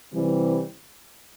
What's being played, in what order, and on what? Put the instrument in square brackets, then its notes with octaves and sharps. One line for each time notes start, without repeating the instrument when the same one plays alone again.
[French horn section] C3 E3 G3 C4